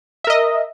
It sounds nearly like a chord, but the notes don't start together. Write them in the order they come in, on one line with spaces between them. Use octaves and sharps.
E5 A#4 D#5